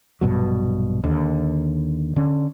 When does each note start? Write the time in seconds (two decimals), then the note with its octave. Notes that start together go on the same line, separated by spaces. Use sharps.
0.21 A#1 G2 B2 F#3
1.04 D#2 D3
2.16 D3 C#4